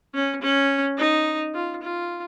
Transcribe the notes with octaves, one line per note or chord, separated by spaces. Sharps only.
C#4
C#4
D#4
F4
F4